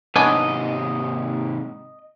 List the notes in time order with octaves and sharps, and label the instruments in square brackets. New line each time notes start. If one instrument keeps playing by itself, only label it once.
[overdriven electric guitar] G#2 C3 [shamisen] B3 C#4 D4 [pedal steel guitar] D#5